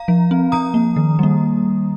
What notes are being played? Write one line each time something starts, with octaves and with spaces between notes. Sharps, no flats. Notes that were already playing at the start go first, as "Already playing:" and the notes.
Already playing: F5 A#5
F3
C4
F3 A#5 D#6
A#3
D#3
G3 A#3